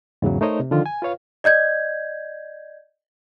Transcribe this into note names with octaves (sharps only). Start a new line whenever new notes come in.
E2 G#2 C#3 E3 F#3
A3 D#4 A#4 C5 C#5 D#5
C3
D3 D#3 F3 F4
G#5
F4 B4 C#5 F5
D5 D#5 G6 G#6